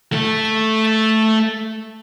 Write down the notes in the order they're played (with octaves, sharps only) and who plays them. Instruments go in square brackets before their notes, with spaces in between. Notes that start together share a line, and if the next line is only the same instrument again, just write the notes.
[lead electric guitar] A3 A4